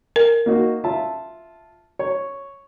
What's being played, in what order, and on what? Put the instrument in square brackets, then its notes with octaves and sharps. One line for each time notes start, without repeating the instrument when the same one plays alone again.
[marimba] A#4
[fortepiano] A#3 D#4 F#4
F4 E5 A5
C#5